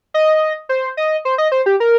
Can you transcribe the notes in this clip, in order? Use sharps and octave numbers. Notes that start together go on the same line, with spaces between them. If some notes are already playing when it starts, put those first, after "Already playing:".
D#5
C5
D#5
C5
D#5
C5
G4
A#4